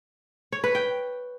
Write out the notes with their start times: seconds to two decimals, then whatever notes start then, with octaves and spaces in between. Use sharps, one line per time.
0.52 C#5
0.64 B4
0.75 G5